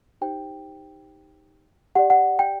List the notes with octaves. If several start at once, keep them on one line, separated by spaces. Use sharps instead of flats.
D#4 G4 C5 G5
G4 D5 F#5
F#5
G5